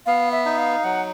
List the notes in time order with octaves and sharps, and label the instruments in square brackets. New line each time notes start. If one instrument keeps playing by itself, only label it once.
[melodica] B3 [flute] F5
[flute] E5
[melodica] D#4
[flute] F5
[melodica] F#3 [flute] F#5